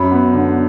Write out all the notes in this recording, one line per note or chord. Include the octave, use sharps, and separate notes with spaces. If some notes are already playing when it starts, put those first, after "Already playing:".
Already playing: F#2 B5
B3
D3